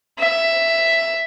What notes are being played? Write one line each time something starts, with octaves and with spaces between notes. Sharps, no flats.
E5